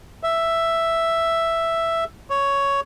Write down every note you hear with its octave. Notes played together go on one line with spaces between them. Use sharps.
E5
C#5